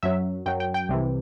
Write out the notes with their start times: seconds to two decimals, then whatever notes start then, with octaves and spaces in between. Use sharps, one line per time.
0.03 F#2 F#3 E5
0.46 F#2 F#3 G5
0.60 G5
0.74 G5
0.89 C2 C3 E3